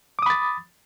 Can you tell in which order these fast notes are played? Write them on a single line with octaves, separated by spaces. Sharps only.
D6 D#6 B5 A6